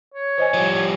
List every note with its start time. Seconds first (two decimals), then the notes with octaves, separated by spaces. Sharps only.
0.14 C#5
0.38 C5 D#5 G#5
0.54 F3 G3